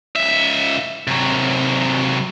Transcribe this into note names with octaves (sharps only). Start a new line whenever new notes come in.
C#2 E5
C3 F#3